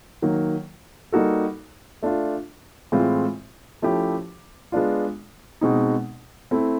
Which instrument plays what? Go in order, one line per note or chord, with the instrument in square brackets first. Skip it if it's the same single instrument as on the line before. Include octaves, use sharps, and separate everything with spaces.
[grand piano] D#3 F#3 A#3
G3 A#3 D#4 F#4 A4
A3 D4 F4
A2 E3 G#3 C4 F4
F3 A3 C#4 E4 G4
G#3 B3 D4 F4
B2 G#3 C4 D#4
A3 C4 E4